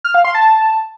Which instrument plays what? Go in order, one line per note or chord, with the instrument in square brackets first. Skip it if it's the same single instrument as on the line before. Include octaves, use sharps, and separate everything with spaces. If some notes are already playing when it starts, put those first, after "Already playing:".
[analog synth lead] F6
F5
C6
A5